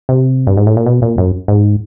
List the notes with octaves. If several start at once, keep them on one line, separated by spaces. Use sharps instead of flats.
C3
G2
G#2
A2
A#2
B2
A#2
F#2
G#2